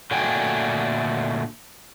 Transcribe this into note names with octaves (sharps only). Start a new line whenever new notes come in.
A#2 D3 A3 F#4 G5 G#5